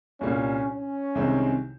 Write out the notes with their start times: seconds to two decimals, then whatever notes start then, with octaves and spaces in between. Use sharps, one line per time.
0.21 C2 A#2 G3 A#3 C#4
0.68 C#4
1.15 C2 C3 D#3 G#3 C4